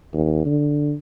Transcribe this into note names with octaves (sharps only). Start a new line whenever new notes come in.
D#2
D3